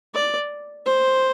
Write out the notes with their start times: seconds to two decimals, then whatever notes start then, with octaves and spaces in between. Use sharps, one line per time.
0.14 D5
0.86 C5